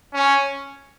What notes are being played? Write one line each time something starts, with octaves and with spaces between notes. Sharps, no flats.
C#4